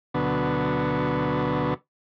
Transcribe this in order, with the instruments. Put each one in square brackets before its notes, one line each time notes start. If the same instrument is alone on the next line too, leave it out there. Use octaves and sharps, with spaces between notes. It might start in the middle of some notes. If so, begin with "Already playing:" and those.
[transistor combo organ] D2 B2 D3 F#3 B3